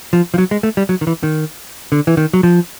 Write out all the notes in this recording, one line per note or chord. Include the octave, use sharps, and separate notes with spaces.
F3
F3
F#3
G#3
A3
G3
F#3
D#3
E3
D#3
D3
E3
D#3
F#3
F3